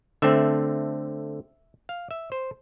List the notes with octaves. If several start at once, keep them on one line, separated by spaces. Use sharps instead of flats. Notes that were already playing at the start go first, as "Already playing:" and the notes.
D3 A3 C4 E5
F5
E5
C5